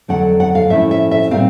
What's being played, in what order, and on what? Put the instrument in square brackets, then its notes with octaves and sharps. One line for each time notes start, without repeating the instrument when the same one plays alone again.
[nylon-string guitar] F2 D3 F#3 A3 F#5
F#5
F5
A2 F3 A3 C#4 E4 E5
E5
E5
A#2 G3 C4 D#4 F5